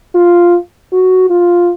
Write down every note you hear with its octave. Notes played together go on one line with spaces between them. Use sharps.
F4
F#4
F4